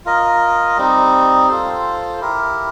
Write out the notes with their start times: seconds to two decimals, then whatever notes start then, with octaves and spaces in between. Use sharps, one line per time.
0.05 F4 A#4 D#5
0.77 G3 C4 D#4
1.48 F4 A4 C5
2.21 E4 G4 A#4